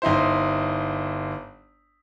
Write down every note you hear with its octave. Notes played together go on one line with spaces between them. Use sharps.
G1 D#4 E4 C5